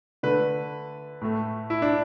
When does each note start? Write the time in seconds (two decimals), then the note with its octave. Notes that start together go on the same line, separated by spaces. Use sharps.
0.23 D3 A3 B4
1.22 A2 A3
1.70 E4
1.82 D4